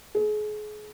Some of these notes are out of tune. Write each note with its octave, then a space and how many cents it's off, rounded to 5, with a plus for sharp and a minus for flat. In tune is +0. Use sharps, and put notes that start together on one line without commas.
G#4 +35